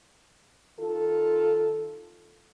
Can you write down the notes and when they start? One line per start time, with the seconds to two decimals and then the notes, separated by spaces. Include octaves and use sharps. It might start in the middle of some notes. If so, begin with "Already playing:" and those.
0.79 D#3 F4 A4